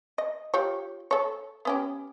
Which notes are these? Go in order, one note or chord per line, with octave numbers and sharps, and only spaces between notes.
D#5
F4 G4 C#5
A4 C#5
B3 C#4 G4